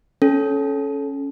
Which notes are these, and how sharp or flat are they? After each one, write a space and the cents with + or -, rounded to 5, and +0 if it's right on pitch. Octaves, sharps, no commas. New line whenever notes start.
C#4 +0 A4 -25